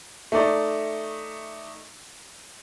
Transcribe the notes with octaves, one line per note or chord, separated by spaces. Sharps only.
A3 D#4 D5